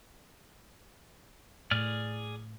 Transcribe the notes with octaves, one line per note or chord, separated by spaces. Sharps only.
A2 G#4 D5 F6